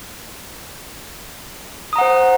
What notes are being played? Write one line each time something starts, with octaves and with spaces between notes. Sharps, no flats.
C5 F#5 A#5 D#6